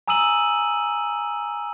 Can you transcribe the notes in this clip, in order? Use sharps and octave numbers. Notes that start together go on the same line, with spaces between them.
G#5 A#5 D#6 E6 D#7 F#7